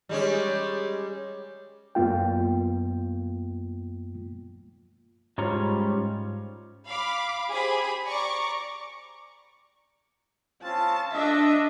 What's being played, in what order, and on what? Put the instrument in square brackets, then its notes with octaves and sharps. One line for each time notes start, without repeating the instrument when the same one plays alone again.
[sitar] G3 G#3 C#4
[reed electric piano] F#2 A#3 B3 F4 G5
[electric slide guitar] G#2 G3 C#4 F4 C#5 A#5
[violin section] F5 B5 D6
G4 G#4 C5 B5
D5 A#5 C#6 D6
[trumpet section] C4 C#4 F4 [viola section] A5
[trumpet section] A3 D#5 [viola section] D4 E5